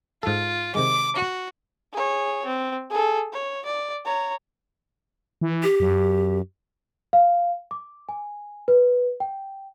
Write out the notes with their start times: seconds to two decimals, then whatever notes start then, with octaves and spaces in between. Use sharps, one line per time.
0.23 G#2 F4 A4
0.75 C3 D#3 G#3 D6
1.16 F#4
1.93 G#4 C#5
2.46 C4
2.90 G#4 A4
3.33 C#5
3.65 D5
4.05 C#5 A#5
5.41 E3
5.63 G4
5.80 F#2
7.13 F5
7.71 D6
8.09 G#5
8.68 B4
9.20 G5